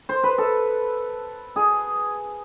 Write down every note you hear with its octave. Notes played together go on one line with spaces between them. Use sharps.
C5
B4
A4
G#4